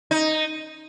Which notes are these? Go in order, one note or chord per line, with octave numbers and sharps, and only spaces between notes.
D#4